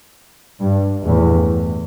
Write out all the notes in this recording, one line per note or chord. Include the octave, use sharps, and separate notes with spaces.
G2
E2 A2